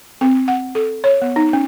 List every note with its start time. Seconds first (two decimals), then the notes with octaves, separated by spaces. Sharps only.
0.21 C4
0.48 F#5
0.75 A4
1.04 C#5
1.22 B3
1.36 D#4
1.53 C#4